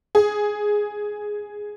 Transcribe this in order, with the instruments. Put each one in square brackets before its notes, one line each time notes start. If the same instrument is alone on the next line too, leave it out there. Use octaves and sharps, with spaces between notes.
[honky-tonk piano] G#4